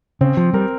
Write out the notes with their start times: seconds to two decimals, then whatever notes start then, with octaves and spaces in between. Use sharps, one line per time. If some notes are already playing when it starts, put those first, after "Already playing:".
0.21 C#3 C4
0.37 F3
0.53 G3 A#4